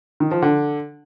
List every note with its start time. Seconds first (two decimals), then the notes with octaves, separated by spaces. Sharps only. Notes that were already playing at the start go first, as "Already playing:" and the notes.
0.20 D#3
0.31 F3
0.42 D3